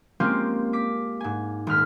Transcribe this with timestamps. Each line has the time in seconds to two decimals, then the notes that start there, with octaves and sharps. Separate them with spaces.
0.20 G#3 A#3 C4 C#4 F4 G4
0.73 D6 B6
1.21 G#2 G#5
1.67 D#1 G#3 F6 B6